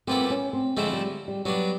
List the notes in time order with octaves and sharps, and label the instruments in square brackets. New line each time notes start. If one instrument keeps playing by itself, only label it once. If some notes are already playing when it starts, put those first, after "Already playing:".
[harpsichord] A#2 G3 B3 E4 A4 [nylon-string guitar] C4
[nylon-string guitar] C#4
C4
[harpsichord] D3 F3 A3 C4 E4 [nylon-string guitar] G#3
[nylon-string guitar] G3
G3
[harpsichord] F#3 B3 D4 [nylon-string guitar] G3